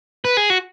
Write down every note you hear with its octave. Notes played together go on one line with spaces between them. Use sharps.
B4
G#4
F#4